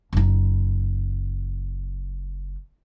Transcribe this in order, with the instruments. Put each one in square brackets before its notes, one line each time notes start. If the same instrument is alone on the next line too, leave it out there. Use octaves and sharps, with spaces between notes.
[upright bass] F#1 D#4